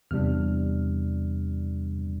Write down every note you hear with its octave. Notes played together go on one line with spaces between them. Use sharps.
E2 C3 G3 D4 F6